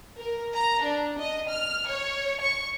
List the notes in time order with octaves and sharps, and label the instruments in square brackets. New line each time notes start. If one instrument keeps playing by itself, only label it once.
[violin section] A#4
A#5
D4
D#5
F6
C#5
C#6